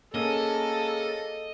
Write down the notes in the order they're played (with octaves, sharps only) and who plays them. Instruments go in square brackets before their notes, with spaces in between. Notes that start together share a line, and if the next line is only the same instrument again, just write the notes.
[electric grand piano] A#3 C#4 E6 [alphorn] G#4 [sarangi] A4 [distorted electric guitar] D#5